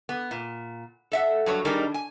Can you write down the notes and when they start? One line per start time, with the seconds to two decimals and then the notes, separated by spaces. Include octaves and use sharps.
0.09 B3
0.31 A#2
1.12 A4 E5 F#5
1.46 G2 F#3 C#5
1.65 D#3 G3 D4 D#4 G#4 A#4
1.94 G#5